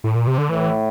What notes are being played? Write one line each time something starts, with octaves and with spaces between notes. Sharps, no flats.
A2
A#2
C3
D3
A2 E3